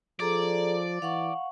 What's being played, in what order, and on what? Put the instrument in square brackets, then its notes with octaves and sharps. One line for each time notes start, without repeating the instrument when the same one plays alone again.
[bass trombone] F3 [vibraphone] G#4 A4 A#5 [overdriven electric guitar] D5
[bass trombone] E3 [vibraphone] F5 F#5 C#6